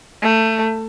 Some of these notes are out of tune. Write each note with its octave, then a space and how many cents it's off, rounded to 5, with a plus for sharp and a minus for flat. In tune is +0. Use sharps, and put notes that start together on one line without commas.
A3 +20